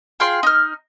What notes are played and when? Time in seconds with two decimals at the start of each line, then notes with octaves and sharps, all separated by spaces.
0.20 F4 G#4 G5 C6
0.43 D#4 F6